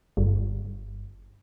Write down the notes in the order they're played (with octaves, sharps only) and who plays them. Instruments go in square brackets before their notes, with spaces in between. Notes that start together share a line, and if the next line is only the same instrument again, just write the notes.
[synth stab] G1